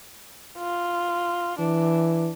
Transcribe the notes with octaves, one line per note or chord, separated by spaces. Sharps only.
F4
E3 D4